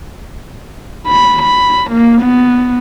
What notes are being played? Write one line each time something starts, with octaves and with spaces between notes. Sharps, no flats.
B5
B5
A#3
B3